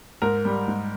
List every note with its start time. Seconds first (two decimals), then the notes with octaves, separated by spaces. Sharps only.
0.22 G#2 A#4
0.45 G3
0.68 G#2